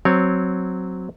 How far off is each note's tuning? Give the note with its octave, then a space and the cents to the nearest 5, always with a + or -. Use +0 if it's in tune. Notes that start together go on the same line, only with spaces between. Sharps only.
F#3 +0 C4 +0 C#5 +0